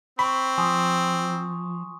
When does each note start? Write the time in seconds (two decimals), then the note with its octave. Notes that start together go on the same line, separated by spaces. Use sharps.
0.19 C4 B5 C#6
0.58 F3 G#5 C6 D#6